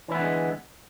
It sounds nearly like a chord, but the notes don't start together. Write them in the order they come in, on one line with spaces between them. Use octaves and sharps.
E3 E4 B3 D3 G#3